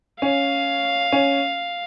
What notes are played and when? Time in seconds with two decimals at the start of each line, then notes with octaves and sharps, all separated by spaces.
0.22 C#4 F5
1.12 C#4